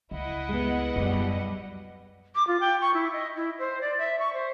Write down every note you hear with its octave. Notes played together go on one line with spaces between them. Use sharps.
C#2 E4 D#5 F#5
G#3 B3
F#2 B2 F#3 G3
D6
F4
G5
C#6
E4
D#5
E4
C5
D5
E5
C#6
C5